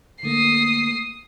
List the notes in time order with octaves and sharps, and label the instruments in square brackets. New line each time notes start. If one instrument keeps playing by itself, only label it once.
[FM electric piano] D3 A3 A#3 [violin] D#6 C7